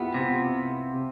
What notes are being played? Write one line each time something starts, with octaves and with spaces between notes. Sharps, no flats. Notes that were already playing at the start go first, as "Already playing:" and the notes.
Already playing: B3 E4 F4 G4
C3